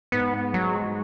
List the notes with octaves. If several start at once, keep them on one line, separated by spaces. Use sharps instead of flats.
G#2 B3
F#3 G#3